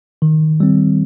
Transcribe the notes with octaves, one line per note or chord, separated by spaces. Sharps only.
D#3
G3 C4